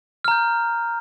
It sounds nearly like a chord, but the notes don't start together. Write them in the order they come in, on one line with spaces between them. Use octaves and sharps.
F6 A#5 G6